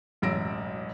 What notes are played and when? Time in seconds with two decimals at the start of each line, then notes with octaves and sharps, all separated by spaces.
0.22 E1 A1 F#2 E6 A#6 D7